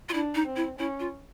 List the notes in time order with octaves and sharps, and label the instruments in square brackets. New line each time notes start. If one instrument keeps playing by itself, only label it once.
[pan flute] F4
[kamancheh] D4 [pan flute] E4
[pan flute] D#4
[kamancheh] C4
[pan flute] E4
[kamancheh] C#4 [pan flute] E4
[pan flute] F4